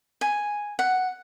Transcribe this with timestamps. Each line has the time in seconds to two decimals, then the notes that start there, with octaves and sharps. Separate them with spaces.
0.21 G#5
0.79 F#5